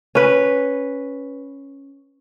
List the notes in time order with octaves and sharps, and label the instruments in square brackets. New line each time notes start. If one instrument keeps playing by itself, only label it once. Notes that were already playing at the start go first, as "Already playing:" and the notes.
[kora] C#4 B4